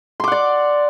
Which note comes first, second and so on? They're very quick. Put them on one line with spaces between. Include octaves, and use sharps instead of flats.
C6 D6 F#5 D5